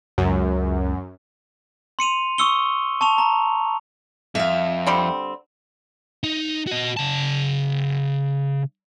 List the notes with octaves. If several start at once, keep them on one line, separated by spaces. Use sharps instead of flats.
C#2 F#2
C6 C#7 D#7 F7
C#6 D#6 E6 C#7 G7
A5 C#6 F7
A#5
F2 E5 F5
D3 G3 C4
D#4
F#4 D#5
C#3 A5